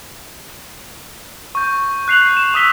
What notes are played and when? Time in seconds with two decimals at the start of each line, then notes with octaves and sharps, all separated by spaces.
1.55 C#6 G6
2.08 F#6 C7 F7 F#7
2.21 C7
2.37 E7
2.54 C#6 D#6 E6 B6 G7